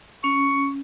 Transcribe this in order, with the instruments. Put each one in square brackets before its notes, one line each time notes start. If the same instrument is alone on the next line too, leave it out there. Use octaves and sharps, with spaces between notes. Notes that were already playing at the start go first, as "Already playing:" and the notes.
[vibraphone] C#4 [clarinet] C#6